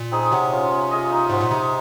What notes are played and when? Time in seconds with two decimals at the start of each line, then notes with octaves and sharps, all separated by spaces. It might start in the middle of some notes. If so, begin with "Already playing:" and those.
Already playing: A#2
0.11 C4 D#4 G#4
0.31 C3 F#3
0.52 C#4 F4
0.71 C#4
0.91 F4 G#4 D#5
1.11 D#4
1.30 G#2 F#4 C5
1.41 A#2
1.51 C3 D#4